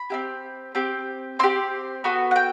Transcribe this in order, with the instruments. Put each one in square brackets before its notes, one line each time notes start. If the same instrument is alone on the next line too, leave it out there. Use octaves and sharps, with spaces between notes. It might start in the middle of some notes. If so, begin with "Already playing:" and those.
Already playing: [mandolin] B5
C4 E4 G4
C4 G4
C4 G4 C6
B3 F#4 A4
F#5
G5